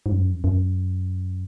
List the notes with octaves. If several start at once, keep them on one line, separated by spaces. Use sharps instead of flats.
G#2
F#2
F2
F#2